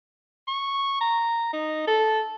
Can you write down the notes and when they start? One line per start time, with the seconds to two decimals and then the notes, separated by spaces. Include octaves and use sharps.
0.48 C#6
1.01 A#5
1.53 D#4
1.87 A4